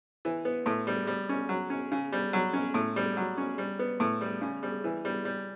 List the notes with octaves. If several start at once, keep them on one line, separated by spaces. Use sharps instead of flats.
E3
B3
A2
G3
G3
C#4
F#3
C#4
C#3
G3
F#3
C#4
A2
G3
F#3
C#4
G3
B3
A2
G3
C#3
G3
E3
G3
G3